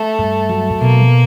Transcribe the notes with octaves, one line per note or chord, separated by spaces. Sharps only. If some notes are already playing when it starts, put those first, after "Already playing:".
Already playing: A3
G2
F#3
B2 A#3